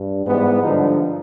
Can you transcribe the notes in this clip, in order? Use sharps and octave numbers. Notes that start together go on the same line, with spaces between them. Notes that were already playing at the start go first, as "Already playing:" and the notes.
Already playing: G2
G#2 E3 G3 B3
G2 D3 F3 D#4